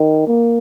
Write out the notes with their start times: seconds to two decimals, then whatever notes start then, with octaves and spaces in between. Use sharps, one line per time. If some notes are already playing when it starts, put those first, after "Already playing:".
Already playing: D#3
0.27 A#3